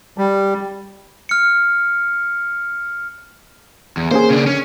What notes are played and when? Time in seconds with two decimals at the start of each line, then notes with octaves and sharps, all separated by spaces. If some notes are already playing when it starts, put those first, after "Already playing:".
0.18 G3
1.29 F6 C#7
3.97 E2
4.11 A#3 C#4 G#4 C5
4.30 C#3 D4
4.47 C#4